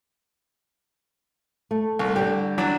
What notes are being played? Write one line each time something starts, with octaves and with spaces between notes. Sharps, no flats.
A3
C2
D3 G3 G4
E3 F#3 D4